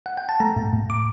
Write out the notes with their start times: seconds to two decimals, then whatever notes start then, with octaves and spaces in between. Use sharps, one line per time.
0.06 F#5
0.17 G5
0.29 A5
0.40 A3 A#5
0.56 A2
0.73 A2
0.90 D6